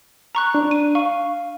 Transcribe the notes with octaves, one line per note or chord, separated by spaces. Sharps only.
A#5 C#6 F#6
D4
D#7
F5 C#6